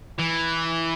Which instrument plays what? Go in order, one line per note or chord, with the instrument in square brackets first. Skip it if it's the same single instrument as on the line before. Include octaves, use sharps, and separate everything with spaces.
[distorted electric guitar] E3